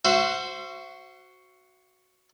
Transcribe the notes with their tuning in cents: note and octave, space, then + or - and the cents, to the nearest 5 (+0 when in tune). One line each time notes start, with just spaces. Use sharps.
F#4 +0 C5 +0 E5 +45